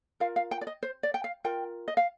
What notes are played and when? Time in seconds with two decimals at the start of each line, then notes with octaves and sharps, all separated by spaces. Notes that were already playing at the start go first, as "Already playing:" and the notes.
0.20 F4 A#4 F5
0.36 F5
0.51 G5
0.61 D5
0.67 D#5
0.83 C5
1.03 D5
1.14 G5
1.24 F5
1.44 F4 A#4 G5
1.88 D#5
1.97 F5